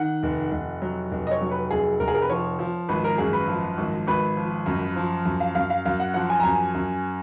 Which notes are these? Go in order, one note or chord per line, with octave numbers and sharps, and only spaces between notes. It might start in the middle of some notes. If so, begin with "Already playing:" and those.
Already playing: D#3 F#5
F1
F1
F#3
F1
D#5
C#5
F#3
B4
F1 G#4
F1 A#4
G#4
A#4
B4
F3 C#5
F3
G#1 B4
A#4
F#2 G#4
B4
F3
G#1
G#1 B4
F3
F#2
F3
F#2
F5
F#2 F5
F5
F#2 F5
F#5
F3 F#5
G#5
A#5
F#2 G#5
F#2